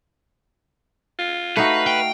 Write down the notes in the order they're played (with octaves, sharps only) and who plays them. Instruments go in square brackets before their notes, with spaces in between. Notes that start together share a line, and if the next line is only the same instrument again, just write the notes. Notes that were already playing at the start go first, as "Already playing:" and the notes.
[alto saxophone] F4
[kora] A3 D#4 F#4 [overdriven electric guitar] B4 [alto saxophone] F5
[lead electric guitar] G5